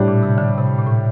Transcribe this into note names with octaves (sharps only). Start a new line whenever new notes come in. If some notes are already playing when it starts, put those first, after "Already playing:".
Already playing: A2 G3 D4
A#2
C3
D3
C3
A#2
A2